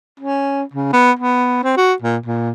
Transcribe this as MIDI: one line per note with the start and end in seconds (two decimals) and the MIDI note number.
0.20 0.62 61
0.73 0.90 49
0.93 1.12 59
1.20 1.60 59
1.64 1.73 60
1.77 1.94 66
2.02 2.17 46
2.26 2.52 46